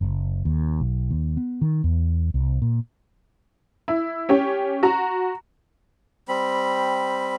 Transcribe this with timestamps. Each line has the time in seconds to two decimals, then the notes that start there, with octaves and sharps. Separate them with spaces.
0.01 F#1
0.45 D#2
0.80 B1
1.11 D#2
1.37 B3
1.61 D#3
1.84 E2
2.34 C2
2.62 A#2
3.88 E4
4.29 C#4 G4 C#5
4.83 F#4 A#5
6.28 G3 C4 B5